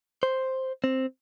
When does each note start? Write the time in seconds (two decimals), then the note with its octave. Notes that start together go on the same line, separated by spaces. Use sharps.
0.23 C5
0.84 C4